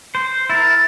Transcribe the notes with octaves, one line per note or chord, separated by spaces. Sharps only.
C5
E4 A#4 A6